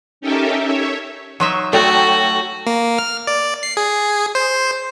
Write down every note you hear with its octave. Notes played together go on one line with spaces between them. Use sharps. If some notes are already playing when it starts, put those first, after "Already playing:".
C#4 D#4 G4 A4 A#4 E5
C#5 E5
F#3 D#4 E5 C6 C#6
A3 F#4 A4 C#5 G5
A#3
F6
D5
C7
G#4
C5